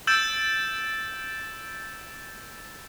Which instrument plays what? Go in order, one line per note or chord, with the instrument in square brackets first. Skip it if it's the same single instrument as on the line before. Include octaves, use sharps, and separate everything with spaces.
[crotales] E6 G6 A6 D7 E7